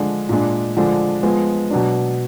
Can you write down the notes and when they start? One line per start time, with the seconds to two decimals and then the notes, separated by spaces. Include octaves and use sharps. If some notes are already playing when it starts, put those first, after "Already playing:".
Already playing: D3 F3 G#3 D4
0.29 A#2 G#3 D4
0.77 D3 F3 G#3 D4
1.23 F3 G#3 B3
1.71 B2 F#3 D4